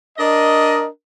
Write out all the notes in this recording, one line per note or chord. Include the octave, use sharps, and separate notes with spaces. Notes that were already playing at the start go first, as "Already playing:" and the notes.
D4 A#4 D#5